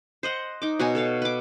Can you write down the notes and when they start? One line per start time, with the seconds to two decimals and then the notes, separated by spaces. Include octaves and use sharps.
0.23 C5 D#5 F#5
0.62 D#4 D6
0.79 B2 F#4 C#5 G#5
0.95 A4 C#5 F5
1.22 B4 D6